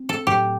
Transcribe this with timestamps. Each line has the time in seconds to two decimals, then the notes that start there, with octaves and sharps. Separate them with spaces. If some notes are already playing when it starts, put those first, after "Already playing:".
Already playing: C4
0.09 A4
0.27 A2 F#3 C4 G4